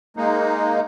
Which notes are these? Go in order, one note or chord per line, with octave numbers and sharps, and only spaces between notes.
G#3 A#3 D#4